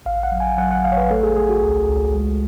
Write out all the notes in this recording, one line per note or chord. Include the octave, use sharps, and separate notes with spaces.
A1 F5
F#5
F#3
G#5
F#3 F#5
F#5
A1 F5
C#5
B4
A3 A4
G#4
A3 G#4
F#4
C#2
C#2
G#3